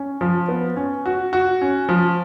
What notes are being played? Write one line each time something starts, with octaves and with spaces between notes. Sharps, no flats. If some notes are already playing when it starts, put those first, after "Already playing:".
Already playing: C#4
F3
B3
C#4
F#4
F#4
C#4
F3